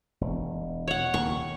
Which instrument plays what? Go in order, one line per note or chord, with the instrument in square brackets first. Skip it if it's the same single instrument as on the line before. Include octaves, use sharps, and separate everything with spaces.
[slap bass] E1
[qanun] C#5 F#5
[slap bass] D#2 A#2 C#3 [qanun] C#6